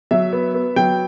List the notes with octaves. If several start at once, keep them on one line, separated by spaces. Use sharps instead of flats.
F#3 E5
B3
B3
F#3 G5